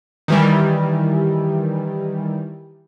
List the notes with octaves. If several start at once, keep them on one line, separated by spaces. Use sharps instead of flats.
D#3 E3 G3